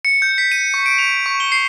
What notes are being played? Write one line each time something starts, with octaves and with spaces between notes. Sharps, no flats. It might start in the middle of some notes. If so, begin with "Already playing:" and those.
C#7
G6
B6
D#7
C#6
D7
F7
C#6
G7
C7